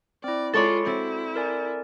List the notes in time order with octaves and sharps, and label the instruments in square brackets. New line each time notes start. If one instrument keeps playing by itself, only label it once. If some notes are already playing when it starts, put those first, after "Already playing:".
[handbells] C4 E4 [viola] D5
[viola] G#3 F4 [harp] A4 C#5 D5 [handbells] B5 A6
[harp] C4 [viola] E4 [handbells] F#4
[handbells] A#4 D5 G#5